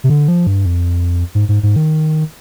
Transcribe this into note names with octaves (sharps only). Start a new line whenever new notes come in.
C3
D3
F3
G2
F2
G#2
G#2
G#2
D#3